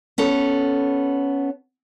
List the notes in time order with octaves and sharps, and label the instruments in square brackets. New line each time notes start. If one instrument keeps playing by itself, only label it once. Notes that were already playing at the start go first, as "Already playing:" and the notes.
[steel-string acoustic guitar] B3 C#4 A4